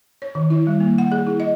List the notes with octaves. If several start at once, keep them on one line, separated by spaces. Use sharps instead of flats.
C#5
D#3
E4
G3
A#3
F#5
G#4
E4
D#5